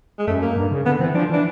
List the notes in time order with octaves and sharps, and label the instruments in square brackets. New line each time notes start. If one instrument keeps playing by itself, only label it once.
[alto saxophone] G#3
[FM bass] F#2 [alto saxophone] A3
[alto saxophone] A#3
[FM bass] G2
C#3
[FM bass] D3 [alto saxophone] B3
[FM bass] E3 [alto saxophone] C4
[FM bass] F3 [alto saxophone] D4
[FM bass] E3 [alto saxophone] D4